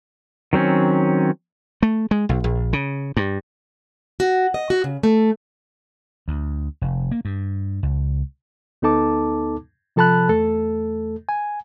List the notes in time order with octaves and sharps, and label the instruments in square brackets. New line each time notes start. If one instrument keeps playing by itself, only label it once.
[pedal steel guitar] D#3 F#3 C4 C#4
[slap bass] A3
G#3
B1
A#1
C#3
G2
[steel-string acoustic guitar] F#4
D#5
F#4
C#3
A3
[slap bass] D2
F1
A#3
G2
C#2
[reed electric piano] D2 B3 D#4 A4 A5 D6
C3 F3 A4 A5 B5 F#6
E2 A3 A4
G#5